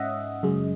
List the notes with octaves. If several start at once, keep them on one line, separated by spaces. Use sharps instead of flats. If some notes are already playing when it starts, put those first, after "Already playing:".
Already playing: G#2 C#4 D#5 E5 F#5
F#2 C#3 G#3